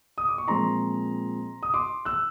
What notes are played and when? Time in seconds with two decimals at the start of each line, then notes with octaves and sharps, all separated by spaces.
0.18 D#6
0.29 D6
0.38 C#6
0.47 A#2 F3 G#3 C4 A#5 C6
1.63 D#6
1.74 C6 D6
2.05 E6 F#6